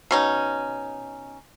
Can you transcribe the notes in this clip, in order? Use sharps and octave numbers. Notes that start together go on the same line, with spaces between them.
B2 C#4 D#4